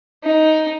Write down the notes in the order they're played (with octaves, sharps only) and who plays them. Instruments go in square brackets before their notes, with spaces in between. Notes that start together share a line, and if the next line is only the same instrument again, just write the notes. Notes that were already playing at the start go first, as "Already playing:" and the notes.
[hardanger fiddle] D#4